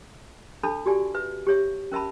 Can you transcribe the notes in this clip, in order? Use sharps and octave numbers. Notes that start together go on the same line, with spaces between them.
D4 A4 A5 B5
F#4 G4 D5 G#5
B4 E5
G4 C#5 E5
C#4 A#4 E5 A5 B5